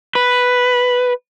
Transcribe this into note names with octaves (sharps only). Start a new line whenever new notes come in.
B4